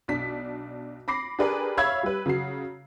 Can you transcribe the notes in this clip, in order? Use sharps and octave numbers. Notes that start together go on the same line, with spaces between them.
B1 D4 B6
B5 D6 A#6 C7
D4 G4 G#4 A#4 B4 D5
C#5 E5 F5 B5 E6 G#6
G3 B4
C#3 F#3 F#4 C7